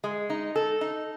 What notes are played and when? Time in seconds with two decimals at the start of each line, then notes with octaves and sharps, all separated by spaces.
0.04 G#3
0.30 D#4
0.56 A4
0.81 D#4